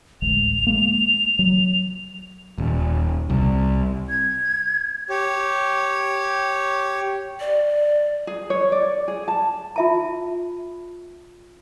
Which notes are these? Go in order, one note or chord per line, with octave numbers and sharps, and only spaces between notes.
A1 D2 G#3 F7
G#3 A#3
F#3
D#1
C2
G#6
G4 C#5
D5
G#4
C#5
D5
G#4
A5
F4 E5 A5